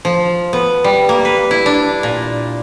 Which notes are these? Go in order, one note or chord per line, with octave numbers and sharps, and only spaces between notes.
F3
B3
G3
A#3
B4
E4
D4
A#2